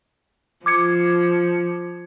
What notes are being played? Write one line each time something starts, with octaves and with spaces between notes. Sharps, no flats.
F3 D6 G#6 C#7